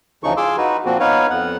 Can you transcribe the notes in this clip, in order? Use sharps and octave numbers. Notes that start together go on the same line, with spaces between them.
D2 C#3 E3 F3 D#4 C#6
F4 G#4 C6 D6 E6
D#4 F#4 B4
A#2 F3 A#3 C4 F#4
B3 D#4 B4 C#5 F5
F2 B3 F#5